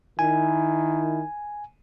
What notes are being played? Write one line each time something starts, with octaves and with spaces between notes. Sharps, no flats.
D#3 E4 G#5